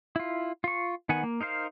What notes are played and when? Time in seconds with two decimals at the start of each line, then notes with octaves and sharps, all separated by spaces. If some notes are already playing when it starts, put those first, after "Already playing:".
0.16 E4 F4
0.64 F4 C#6
1.09 D#3 B3 F#5 G#5
1.23 A#3
1.41 D#4 A#4 C5 F5